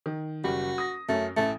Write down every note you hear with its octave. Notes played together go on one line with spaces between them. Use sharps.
D#3
F#1 G3 F#4
D#6 A#6
F#2 A3 C#4
A1 E3 A3